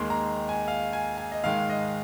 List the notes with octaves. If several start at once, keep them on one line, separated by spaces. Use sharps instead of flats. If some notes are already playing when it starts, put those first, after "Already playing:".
Already playing: D#2 D#3 G#3 C6
A#5
G#5
F5
G#5
G#5
D#5
G#2 D#3 G#3 F5
D#5